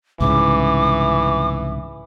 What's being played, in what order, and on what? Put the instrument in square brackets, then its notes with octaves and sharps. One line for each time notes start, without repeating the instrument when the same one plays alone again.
[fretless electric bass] C2 G#2 C#3 [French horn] E3 [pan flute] D6